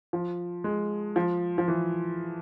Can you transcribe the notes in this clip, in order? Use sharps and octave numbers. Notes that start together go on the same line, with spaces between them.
F3
G#3
F3
F3
E3